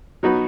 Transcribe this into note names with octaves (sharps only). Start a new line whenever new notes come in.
F#3 B3 D#4 F#4 B4